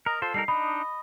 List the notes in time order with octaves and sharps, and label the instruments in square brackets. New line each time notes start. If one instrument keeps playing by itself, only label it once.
[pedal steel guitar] A#4 [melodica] D#5 A#5
[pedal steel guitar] F4 C5 [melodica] A4
[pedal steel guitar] G3 D#4 A#4 [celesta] C7
[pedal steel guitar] D4 D#4 [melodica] D#5 [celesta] B5